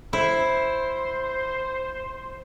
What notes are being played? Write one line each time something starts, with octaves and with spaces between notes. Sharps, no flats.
E4 C5